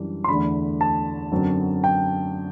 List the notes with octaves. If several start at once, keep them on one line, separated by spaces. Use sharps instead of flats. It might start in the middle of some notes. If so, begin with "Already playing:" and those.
Already playing: F#2 E3 G3 D4
C6
E2 D3 A3 D4 B5
A5
F#2 D3 F#3 C4
G5